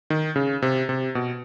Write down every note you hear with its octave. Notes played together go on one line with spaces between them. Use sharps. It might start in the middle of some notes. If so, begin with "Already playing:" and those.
D#3
C#3
C3
C3
B2